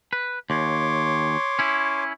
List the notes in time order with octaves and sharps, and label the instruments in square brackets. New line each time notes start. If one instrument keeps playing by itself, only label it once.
[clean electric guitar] B4
[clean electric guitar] D#2 [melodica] C#5 C6 D6
[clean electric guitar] C#4 E4